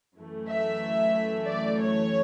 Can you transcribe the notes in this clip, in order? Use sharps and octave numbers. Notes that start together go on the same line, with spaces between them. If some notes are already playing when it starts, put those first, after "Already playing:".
F#2 E3 A3
E5
D5
C#5